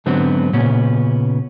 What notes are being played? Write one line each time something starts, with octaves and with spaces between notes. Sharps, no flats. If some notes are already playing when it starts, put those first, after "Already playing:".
G#2 D3 F#3 B3 C4
A#2 C#3 B3 C#4